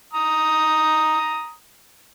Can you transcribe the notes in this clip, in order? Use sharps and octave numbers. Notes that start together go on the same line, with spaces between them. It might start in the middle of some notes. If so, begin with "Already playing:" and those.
A#5 D#6